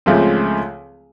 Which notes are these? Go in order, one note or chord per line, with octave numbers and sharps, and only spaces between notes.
C#2 C#3 F3 A3 C4